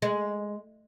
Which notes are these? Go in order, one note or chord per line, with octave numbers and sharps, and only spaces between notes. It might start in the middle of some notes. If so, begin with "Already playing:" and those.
G#3